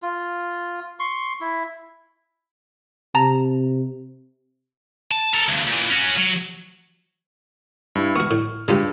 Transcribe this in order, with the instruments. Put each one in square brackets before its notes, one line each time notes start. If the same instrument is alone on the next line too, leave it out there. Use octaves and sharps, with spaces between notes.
[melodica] F4
C6 C#6
E4
[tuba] C3 [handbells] A5 A#5
[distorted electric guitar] A5
A4 A#4
D2 G2
A#2 E3
C#4 F#4
F#3
[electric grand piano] G2 E4
[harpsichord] B3 F#4 [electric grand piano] C#6 F6
[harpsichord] A2
[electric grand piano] G2 [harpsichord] C#3 F4 G4